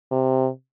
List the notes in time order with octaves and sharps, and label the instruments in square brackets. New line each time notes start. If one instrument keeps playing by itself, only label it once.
[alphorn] C3